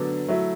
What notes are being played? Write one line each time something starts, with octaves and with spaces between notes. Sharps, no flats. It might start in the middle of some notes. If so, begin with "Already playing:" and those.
Already playing: D3 F#3 B3 D4
F#3 A3 E4